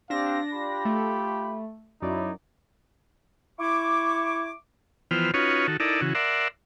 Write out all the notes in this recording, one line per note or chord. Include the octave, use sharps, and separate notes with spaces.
C4 D4 G4 F5 A#6
F4 G4 B5
A3
F#2 F#3 D#4 E4 D5
E4 C#6 D6
E3 F3 B3 C5 G5 F6
C#4 D#4 F4 F#4 B4 C#5
D#3 F#4 A4
D#4 E4 A4 A#4 D5
C#3 E3 F#4
A#4 D5 E5 F#5 C6